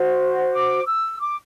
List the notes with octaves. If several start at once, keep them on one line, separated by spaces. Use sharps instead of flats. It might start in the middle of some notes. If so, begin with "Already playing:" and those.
Already playing: F#4 C5
D6
E6
D6